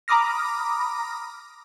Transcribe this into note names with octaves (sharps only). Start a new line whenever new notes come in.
A#5 B5 D6 D#6 F6 A#6